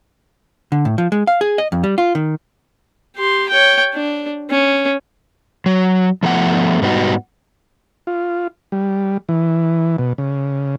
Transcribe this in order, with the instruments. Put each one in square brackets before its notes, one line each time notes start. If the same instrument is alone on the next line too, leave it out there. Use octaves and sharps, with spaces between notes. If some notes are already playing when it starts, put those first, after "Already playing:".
[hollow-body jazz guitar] D3
A2
F3
G#3
F5
G#4
D#5
F2
G3
F4
D#3
[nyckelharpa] G4 C6
C#5 G5
D4
C#4
[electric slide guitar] F#3
F3 A3 B3 F#5
G#2 G3 B3 D4 D#4 F#4
[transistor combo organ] F4
G3
E3
B2
C#3